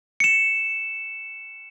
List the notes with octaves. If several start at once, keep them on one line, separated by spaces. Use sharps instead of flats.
C#7 E7